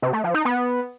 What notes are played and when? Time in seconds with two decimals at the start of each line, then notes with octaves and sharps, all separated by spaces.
0.02 C3
0.13 A3
0.24 F3
0.34 D#4
0.45 B3